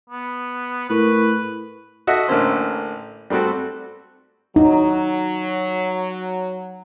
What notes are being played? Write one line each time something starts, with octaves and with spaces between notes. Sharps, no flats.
B3
A2 A#4 B4 C#6
F#4 A4 D#5 E5 F#5
A1 D3 A#3 C#4 C5 E6
G3 A3 C4 F#4 A4
F#3 D#4